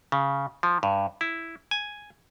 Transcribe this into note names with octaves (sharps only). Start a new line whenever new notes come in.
C#3
F3
G2
E4
G#5